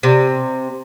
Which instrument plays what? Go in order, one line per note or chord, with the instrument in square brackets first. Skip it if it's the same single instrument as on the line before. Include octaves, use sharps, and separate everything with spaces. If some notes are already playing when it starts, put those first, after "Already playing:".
[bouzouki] C3